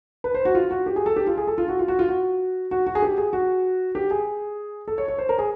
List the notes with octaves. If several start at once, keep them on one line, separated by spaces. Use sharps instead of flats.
B4
C5
F#4
F4
F#4
G4
G#4
A4
G4
F4
G#4
A4
F4
F#4
F4
F#4
F4
F#4
F#4
F#4
G#4
G4
G#4
F#4
G4
G#4
A4
C#5
C#5
C5
A#4
G#4